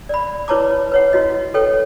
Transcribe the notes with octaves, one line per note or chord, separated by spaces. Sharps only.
D5 B5
E4 B4 C#5 A5 A#5 D6
B4 C#5 F#5
E4 F#4 D#5
A4 B4 C#5 G5